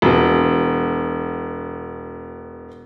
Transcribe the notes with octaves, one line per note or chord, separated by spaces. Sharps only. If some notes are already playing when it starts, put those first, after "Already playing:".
E1 B2